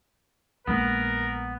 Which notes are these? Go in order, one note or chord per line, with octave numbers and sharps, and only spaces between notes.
A#1 G#3 A#3 B3 A#4